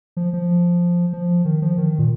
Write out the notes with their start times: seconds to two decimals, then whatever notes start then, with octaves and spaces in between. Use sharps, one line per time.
0.17 F3
0.33 F3
1.13 F3
1.45 D#3
1.62 F3
1.78 D#3
1.99 A#2